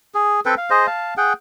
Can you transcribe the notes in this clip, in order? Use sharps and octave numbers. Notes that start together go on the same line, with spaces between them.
G#4
C4 A4 B4 G5
F5
G#4 C5 D#5
F5 A5
G#4 F#5 G5